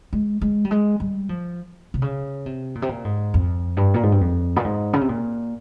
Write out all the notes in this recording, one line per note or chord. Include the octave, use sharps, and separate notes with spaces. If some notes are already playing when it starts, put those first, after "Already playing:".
G#3
G#3
G3
G#3
G3
F3
C3
C#3
C3
A#2
C3
A#2
G#2
F2
G2
A#2
G#2
G2
F2
A#2
G#2
C#3
C3
A#2